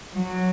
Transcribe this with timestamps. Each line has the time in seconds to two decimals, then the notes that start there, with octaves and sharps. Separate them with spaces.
0.14 F#3